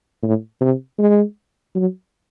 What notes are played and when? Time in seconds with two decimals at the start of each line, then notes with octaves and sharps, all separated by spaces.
0.23 A2
0.61 C3
0.99 G#3
1.75 F#3